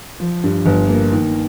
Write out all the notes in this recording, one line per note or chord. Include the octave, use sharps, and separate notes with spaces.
F3
G2
G1
A#3
D#3